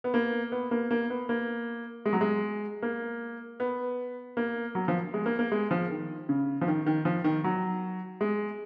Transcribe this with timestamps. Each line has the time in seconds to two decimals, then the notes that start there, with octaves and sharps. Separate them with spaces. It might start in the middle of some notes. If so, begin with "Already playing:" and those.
0.04 B3
0.14 A#3
0.52 B3
0.71 A#3
0.91 A#3
1.10 B3
1.29 A#3
2.06 G#3
2.13 F#3
2.21 G#3
2.82 A#3
3.60 B3
4.37 A#3
4.75 F#3
4.88 F3
5.14 G#3
5.26 A#3
5.39 A#3
5.52 G#3
5.71 F3
5.90 D#3
6.29 C#3
6.61 F3
6.68 D#3
6.86 D#3
7.05 F3
7.24 D#3
7.44 F#3
8.21 G#3